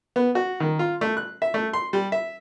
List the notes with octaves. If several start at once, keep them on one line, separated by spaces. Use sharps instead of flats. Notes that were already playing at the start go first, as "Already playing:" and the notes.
B3
F#4
D#3
F4
A3
F#6
E5
A3
C6
G3
E5